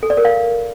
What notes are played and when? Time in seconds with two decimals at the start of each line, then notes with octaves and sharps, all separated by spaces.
0.03 A4
0.10 D5
0.17 A#4
0.25 F5